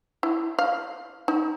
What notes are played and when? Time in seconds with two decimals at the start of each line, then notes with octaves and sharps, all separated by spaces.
0.23 E4
0.59 F5
1.28 D#4